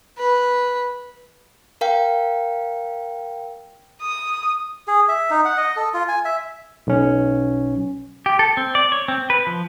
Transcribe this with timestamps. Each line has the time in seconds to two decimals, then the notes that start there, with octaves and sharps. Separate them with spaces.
0.18 B4
1.81 A#4 F5 G5
4.02 D#6
4.88 G#4
5.08 E5
5.31 D#4
5.45 F#5
5.58 D#5
5.76 A4
5.94 F4
6.08 G#5
6.25 E5
6.87 B1 C#4
8.26 G4
8.39 A4
8.57 C4
8.75 D5
8.92 C#5
9.08 C4
9.30 B4
9.47 F3